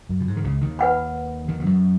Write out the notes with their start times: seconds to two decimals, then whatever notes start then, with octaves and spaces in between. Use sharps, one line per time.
0.09 F#2
0.20 B2
0.27 G#2
0.37 D#3
0.44 C#2 C#3
0.61 D#2 D#3
0.79 B4 F#5 B5
1.48 D#2 D#3
1.60 D#3
1.66 F#2 F#3